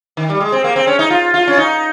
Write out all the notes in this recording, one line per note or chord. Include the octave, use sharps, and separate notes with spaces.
D#3
G3
G#3
C4
A#3
C4
C#4
D#4
F4
F4
C#4
D#4